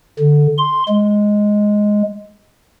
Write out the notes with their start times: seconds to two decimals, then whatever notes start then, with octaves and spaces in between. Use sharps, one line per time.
0.19 D3
0.58 C6
0.89 G#3